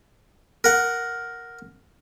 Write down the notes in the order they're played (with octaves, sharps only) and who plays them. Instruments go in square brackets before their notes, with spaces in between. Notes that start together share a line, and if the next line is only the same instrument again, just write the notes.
[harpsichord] A#4 F#5